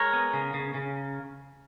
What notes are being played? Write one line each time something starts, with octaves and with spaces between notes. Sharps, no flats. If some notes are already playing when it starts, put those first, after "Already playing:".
Already playing: G#3 A#4 C#5
B3
C#3
C#3
C#3